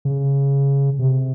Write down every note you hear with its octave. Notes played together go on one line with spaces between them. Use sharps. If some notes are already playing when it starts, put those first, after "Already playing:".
C#3
C3